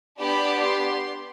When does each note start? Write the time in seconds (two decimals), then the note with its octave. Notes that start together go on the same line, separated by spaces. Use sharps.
0.19 B3 D4 G4 B5
0.63 C6